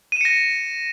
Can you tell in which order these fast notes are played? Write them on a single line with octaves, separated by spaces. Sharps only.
D#7 E7 C#7 A#6